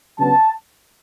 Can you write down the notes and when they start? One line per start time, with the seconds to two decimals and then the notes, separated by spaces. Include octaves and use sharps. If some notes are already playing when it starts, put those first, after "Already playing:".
0.18 C#3 F#3 B3 D4 A5